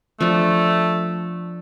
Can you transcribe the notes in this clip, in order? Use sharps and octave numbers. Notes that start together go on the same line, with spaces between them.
F3 A3 D4